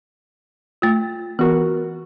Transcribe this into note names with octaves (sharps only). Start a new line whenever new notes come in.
A3 F4
E3 B3 F#4 A#4